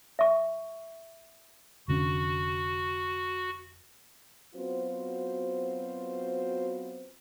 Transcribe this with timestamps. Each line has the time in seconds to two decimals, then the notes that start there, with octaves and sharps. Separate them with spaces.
0.19 E5 C#6
1.88 F1 D3 C#4 F#4
4.55 F#3 B3 C4 F4 F#4 C5